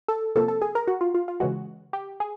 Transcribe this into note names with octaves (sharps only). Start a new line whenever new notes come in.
A4
C3 F3 A#3 A4
A4
G#4
A#4
F#4
F4
F4
F4
C#3 E3 G#3 F#4
G4
G#4